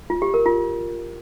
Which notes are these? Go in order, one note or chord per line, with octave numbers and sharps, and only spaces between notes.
F4
G4
A#4
F4